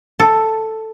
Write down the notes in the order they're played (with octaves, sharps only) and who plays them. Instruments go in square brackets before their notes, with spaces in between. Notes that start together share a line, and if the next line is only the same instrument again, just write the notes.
[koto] A4